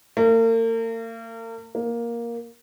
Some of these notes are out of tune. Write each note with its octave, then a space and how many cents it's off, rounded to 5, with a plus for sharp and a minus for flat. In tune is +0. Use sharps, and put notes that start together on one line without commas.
A#3 -40
A#3 +10